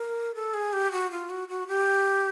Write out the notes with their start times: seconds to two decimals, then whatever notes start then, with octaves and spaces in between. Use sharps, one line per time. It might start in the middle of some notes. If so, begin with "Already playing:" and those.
Already playing: A#4
0.35 A4
0.54 G#4
0.73 G4
0.92 F#4
1.11 F4
1.30 F#4
1.48 F#4
1.68 G4